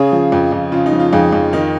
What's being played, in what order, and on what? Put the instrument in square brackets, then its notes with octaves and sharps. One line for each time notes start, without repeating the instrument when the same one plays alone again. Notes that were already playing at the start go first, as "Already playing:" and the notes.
Already playing: [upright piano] C#3 G#4 C#5
F3
F2
F2
C#3 F4
D#4
F3
F4
F2 D#4 G#4
F2
D#3 D#4